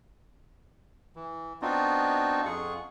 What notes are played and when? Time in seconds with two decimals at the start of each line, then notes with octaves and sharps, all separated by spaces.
1.16 E3
1.62 B3 C4 D4 D#4 F4 F#4
2.46 F2 F4 G#4 F#5 C#6